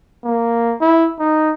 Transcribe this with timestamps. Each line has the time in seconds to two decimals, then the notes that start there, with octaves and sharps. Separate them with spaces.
0.25 A#3
0.81 E4
1.19 D#4